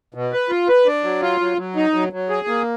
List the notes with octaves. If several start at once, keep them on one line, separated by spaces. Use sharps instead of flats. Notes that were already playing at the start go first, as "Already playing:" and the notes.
B2
B4
F4
B4
D4
F#3
F4
F#3
F#3
D#4
F#3
F#3
G#4
A#3